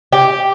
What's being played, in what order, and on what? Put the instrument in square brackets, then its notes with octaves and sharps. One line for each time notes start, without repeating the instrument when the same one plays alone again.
[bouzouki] G4